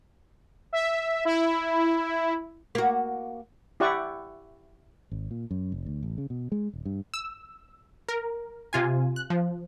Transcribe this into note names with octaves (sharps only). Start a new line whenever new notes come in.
E5
E4
A#3 F#4
E4 G4 D5 F#5 C#6
G#1
A#2
F#2
F1
D2
A1
C#3
B2
G#3
D#1
G2
E6
A#4
C3 F4 G#5
F#6
F3